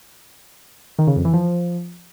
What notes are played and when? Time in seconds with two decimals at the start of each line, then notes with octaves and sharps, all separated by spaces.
0.99 D#3
1.07 C#3
1.16 F2
1.25 E3
1.33 F3